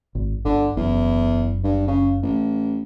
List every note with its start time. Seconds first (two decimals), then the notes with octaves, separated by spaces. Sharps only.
0.15 G#1
0.45 G1 D3
0.77 F#1 E2
1.64 G2
1.87 C#3
2.23 A1